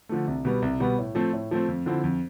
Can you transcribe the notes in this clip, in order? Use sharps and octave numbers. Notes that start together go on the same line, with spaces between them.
D3 F3 A3
C2
B2 G3 B3
C2
B2 G3 B3
A2
F3 A3 C4
A2
F3 A3 C4
F2
D3 F3 C4 E4
F2